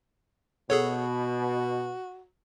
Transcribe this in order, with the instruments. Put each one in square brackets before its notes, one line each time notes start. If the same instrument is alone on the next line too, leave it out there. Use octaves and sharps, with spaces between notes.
[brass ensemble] B2 [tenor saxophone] F#4 [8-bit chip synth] G#4 A4 C#5